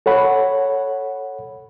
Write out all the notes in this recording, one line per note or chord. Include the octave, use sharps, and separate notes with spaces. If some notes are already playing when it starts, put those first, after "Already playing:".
A4 C#5 F#5 B5